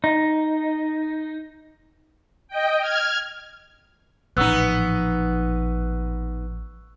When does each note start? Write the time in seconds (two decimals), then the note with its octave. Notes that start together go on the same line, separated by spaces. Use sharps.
0.04 D#4
2.48 D#5 G5
2.80 F6 G#6
4.37 A1 A#2 F3 B3 D#4 C#6 E6 F#6